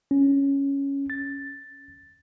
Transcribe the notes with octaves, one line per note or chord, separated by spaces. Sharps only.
C#4
A6